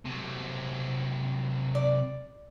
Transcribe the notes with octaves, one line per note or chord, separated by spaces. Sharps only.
C3 F#3
D5